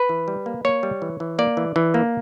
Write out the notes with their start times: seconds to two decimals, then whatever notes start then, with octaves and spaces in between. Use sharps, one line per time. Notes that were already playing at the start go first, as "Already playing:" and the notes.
Already playing: B4
0.09 E3
0.28 G3
0.46 A#3
0.65 A#3 C#5
0.83 G3
1.02 E3
1.20 E3
1.39 A#3 D5
1.57 E3
1.76 E3
1.94 A#3